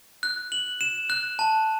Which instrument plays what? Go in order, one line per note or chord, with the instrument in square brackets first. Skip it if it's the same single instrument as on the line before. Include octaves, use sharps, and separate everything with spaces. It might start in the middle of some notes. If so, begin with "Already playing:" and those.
[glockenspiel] F#6
F#7
E7
F#6
A5